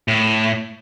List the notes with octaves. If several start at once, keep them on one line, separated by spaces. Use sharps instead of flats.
A2